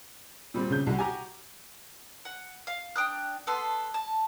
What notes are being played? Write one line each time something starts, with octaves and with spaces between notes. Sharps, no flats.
A#2 G3 C4
C#3 G6
C2 E4 F#4
F#4 G4 G#5 A#5
F#5
F5
D4 G5 D#6 F#6
B3 A4 C6
A5